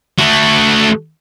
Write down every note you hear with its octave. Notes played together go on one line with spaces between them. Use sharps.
A3 F#4